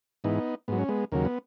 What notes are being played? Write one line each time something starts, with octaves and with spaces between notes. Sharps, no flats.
G#2 E3 B3 D#4
G#2 F#3 B3
C#4
G#3 B3
D#2 C#3 F#3 A#3
B3